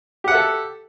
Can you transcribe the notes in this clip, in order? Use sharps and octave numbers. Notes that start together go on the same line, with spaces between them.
G4 A4 E5 F#5